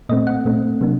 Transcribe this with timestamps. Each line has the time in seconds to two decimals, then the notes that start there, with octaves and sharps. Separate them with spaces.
0.09 A#2 A3 C4 D#5
0.27 F#5
0.45 A#2 A3 C4
0.81 C3 F#3 A#3 D4